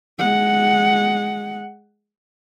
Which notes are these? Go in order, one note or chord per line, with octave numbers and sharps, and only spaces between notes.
G#3 F#5